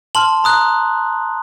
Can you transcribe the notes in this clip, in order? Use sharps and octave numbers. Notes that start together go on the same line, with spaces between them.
A5 C6 F6 F#7
A#5 D#6 F#6